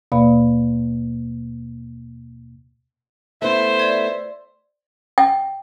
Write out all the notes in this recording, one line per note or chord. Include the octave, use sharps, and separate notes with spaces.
D#2 B2 A#3 D5 F5 B5
A3 B3 E4 C5 E5
D5 G#6
G5